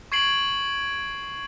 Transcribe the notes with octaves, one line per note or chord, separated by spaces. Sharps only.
C#6 G#6 C7 D7 F#7